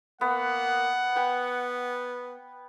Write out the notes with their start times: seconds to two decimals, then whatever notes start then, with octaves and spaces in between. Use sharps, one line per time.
0.21 A#3 B3 F#5
1.16 B3 G5 B5